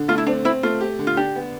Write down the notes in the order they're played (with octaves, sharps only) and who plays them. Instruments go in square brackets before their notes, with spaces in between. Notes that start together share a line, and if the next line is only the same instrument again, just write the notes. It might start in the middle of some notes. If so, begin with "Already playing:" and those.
Already playing: [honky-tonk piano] D3
[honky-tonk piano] A3 [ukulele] F4
[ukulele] E4
[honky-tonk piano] C4 [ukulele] D4
[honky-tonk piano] C4 [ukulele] E4
[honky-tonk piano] A3 [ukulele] F4
[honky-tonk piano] G4
D3
[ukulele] F4
[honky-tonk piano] D4 [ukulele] G4
[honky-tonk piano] B3